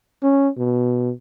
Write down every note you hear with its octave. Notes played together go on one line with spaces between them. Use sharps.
C#4
B2